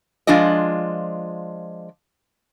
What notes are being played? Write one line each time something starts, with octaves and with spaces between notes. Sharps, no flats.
F3 G#3 D4 F4 D#5